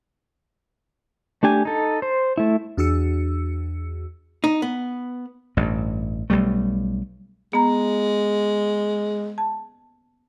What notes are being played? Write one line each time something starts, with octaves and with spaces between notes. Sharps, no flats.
A3 D4 G4 G#5
D#4 A4
C5
A3 E4
E2 D4 F#4 G#4 E6 C#7
D#4
B3
A1 G2
B1 G3 A3
G#3 B3 A#5
A5